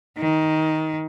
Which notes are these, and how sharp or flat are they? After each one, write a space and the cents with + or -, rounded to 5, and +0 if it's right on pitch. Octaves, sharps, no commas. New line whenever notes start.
D#3 +15